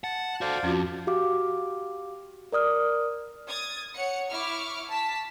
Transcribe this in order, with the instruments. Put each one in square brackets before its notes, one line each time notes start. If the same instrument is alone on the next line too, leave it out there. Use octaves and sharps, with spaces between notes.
[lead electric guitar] F#5 [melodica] A5
[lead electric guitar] F#4 A4 [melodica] C5 D5 F5
[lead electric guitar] F2 [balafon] C#4 F4 F#4
[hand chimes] F#4 G4 F5 D6
A#4 D5 D#6 F6
[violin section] D#6 G#6 A6
C#5 F#5 C#7
E4 C#6 D6 F6
A5 B6